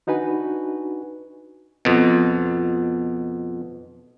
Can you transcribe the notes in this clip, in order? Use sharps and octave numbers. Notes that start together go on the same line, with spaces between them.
D4 D#4 F#4 B4 G#5
F2 B2